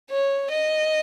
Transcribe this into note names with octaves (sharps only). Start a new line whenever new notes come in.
C#5
D#5